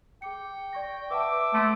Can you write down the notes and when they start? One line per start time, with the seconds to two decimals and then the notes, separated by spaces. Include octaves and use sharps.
0.22 G#4 G5 D6 C#7
0.73 D5 C#6 A#6
1.11 B4 E5 F#5 A5 D6
1.54 A3 A5 C6